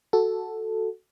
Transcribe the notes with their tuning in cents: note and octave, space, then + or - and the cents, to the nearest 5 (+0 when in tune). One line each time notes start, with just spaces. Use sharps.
F#4 +0 A4 +0